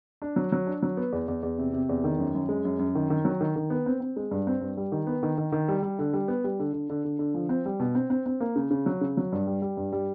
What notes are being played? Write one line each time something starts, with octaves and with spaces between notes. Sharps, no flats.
D4
F#3
F#3
D4
F#3
B3
E2
E2
E2
C3
C3
E2
D#3
F#2
F#2
G#3
F#2
F#2
D#3
D#3
F#3
D#3
D#3
B3
C4
C4
G#3
G2
C4
G2
G3
D#3
B3
D#3
D#3
D#3
G3
G3
D3
G3
B3
G3
D3
D3
D3
D3
D3
F3
C4
G3
B2
C4
C4
C4
A#3
C#3
C#3
F#3
C#3
F#3
G2
G3
G3
G2
G3